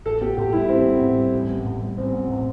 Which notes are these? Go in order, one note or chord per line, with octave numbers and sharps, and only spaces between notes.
A1 A4
B3 G4
A2 G4
G3 E4
A1 C4
B3
A2
G3
A1
B3
A2
G3
A1 C4
B3
A2